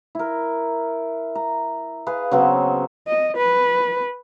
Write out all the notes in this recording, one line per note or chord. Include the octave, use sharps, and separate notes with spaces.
E4 A#4
A#5
G#4 B4 F5
C#3 F#3 B3 C4
D#5
B4